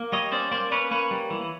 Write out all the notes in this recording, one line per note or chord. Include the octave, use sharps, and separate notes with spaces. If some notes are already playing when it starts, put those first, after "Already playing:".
Already playing: A#3
G3 C#5 D#5
C#4 C5 D5
A#3 C5 D5
C#4 B4 C#5
A#3 B4 C#5
G3
E3